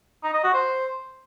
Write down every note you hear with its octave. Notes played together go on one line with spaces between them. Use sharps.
D#4
D#5
F#4
C5